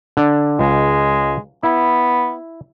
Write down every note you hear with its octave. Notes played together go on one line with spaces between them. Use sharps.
D3 D5
C#2 G#3
B3 E4